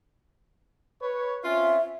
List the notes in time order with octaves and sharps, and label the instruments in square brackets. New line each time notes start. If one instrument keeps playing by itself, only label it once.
[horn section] B4 C#5
[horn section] C4 C#4 F4 [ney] E5